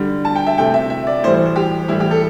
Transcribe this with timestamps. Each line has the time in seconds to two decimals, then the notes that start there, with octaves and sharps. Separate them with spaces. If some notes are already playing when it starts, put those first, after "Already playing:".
Already playing: D3 G3
0.25 A5
0.35 G5
0.47 E5
0.58 C3 A3 G5
0.74 E5
0.90 E5
1.07 D5
1.23 A2 E3 G3 C5
1.34 C5
1.46 C5
1.56 G4
1.88 A2 E3 G3 E4
2.00 G4
2.11 A4